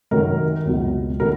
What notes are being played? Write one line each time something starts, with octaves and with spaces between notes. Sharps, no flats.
F#2 D#3 F#3 A#4
C#2 B2 F#3
D#3 F#3 A#4